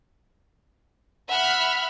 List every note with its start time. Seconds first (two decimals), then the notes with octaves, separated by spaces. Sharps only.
1.29 E5 F#5 B5 F6